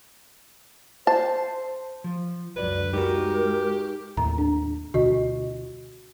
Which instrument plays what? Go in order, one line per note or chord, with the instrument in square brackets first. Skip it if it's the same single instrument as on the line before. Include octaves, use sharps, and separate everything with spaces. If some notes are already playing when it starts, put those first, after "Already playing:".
[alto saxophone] C5 [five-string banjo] A5
[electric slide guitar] F3
[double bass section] C#2 F#2 D3 [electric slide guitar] F#3 D5 [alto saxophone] B4
[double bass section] G#3 [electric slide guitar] D#4 F#4 [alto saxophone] G4 [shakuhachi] A#4
[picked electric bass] D#2 A2 [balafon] A#5
[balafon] D4
[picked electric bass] D2 B2 D3 [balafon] F#4 D#5